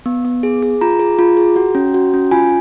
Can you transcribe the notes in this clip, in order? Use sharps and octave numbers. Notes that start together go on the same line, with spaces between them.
B3
B3
G#4
G#4
F4 A#5
G#4
F4
G#4
F#4
C#4
F#4
C#4
F4 G#5